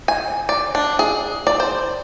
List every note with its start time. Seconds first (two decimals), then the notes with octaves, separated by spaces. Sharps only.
0.08 G#5
0.49 D5
0.75 D4
0.99 G#4
1.47 D5
1.60 C5